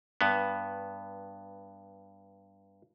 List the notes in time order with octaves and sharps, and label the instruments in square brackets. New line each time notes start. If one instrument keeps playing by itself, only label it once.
[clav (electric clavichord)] G2 B3